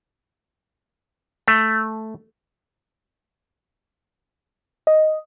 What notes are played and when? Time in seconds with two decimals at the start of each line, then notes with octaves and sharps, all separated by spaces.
1.48 A3
4.87 D#5